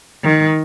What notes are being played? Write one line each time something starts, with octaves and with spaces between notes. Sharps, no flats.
D#3